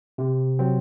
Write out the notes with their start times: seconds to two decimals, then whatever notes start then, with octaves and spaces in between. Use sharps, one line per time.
0.18 C3
0.59 F#3 C4